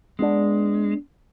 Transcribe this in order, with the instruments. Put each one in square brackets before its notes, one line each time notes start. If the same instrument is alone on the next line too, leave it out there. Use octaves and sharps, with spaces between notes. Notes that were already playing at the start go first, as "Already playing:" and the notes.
[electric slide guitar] G#3 [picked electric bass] B3 D4